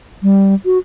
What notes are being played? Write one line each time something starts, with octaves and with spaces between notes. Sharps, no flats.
G3
F#4